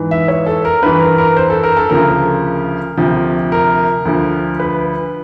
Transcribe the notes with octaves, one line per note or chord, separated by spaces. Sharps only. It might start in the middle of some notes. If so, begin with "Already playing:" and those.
Already playing: G#2 E3
E5
C#5
A4
A#4
G2 E3 B4
A#4
A#4
C5
A4
A#4
A4
D2 C#3 F3 A#4
D2 C3 F3
A#4
D2 D3 F3
B4